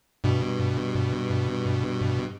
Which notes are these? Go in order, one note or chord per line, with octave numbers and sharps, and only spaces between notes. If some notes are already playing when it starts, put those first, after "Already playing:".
G2 B2